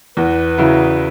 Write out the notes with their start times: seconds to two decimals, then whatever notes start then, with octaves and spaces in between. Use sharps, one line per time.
0.17 E2 B4
0.58 C#3 F#3 E4